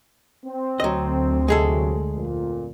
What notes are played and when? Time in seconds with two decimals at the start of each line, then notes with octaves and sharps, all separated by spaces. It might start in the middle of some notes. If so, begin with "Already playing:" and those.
0.46 C4
0.80 D2 F#3 D#5
1.48 C3 F#3 G#3 G#4 A4
2.14 F2 A#2